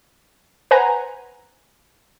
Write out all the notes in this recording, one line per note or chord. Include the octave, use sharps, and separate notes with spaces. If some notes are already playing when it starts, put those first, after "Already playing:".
B4 C5 F#5 G#5 A#5